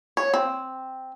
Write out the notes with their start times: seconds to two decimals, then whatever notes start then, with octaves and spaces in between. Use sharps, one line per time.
0.17 C#5
0.34 C4